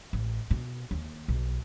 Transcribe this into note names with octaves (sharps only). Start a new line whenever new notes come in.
A1
B2
D#2
B1